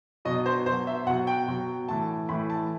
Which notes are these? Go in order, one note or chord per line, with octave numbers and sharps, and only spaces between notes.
B2 F#3 D#5
C5
B2 F#3 C5
E5
B2 F#3 F#5
G5
B2 F#3
A2 E3 A5
A2 E3 B5
A5